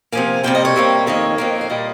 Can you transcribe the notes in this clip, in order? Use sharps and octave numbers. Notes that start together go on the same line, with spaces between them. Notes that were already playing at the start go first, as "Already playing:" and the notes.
C3 F3 A#3 G#5
C3 G3 A#3 G5
D#5
C#5
C3 G3 A#3
F2 D#3 A#3 C#5
F2 D#3 A#3
F5
A#2 G3 A#3 D#5